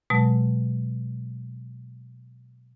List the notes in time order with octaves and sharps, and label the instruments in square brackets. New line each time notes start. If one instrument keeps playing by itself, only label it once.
[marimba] B2 F#3 G#3 A5